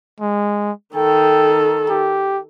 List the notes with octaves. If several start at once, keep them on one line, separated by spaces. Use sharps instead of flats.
G#3
D#3 A4 G5
G4